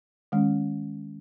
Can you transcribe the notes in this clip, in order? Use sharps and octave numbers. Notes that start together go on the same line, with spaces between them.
D#3 G#3 C#4